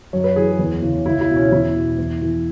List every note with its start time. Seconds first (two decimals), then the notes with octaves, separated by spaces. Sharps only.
0.13 F#2 C#5
0.24 B4
0.36 E3 G#4
0.59 E2
0.82 C#3 E3
1.05 C#2 E4
1.21 E4
1.29 B2
1.36 C#4
1.52 E2 E4
1.75 B2
1.98 E2
2.22 E3